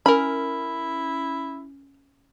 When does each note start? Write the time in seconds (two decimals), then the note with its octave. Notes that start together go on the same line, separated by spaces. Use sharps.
0.06 C#4 E4 A#4 B5